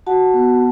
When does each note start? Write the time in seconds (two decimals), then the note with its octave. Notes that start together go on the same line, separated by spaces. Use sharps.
0.07 F#4 F#5 A5
0.34 B3